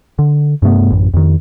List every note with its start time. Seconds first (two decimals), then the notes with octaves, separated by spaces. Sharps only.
0.19 D3
0.62 G2 C3 A3 B3
0.91 A1 F#2
1.14 F2 D#3